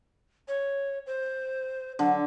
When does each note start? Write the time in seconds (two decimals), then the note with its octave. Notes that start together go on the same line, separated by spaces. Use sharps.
0.48 C#5
1.06 C5
1.99 D3 F#3